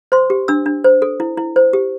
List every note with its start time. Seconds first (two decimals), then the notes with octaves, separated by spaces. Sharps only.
0.12 C5 C6
0.30 G4
0.48 D4 E6
0.66 D4
0.84 C5
1.02 A4
1.20 E4
1.37 E4
1.56 C5
1.73 G4